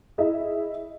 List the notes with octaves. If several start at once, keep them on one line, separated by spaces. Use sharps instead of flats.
E4 G#4 D#5 E5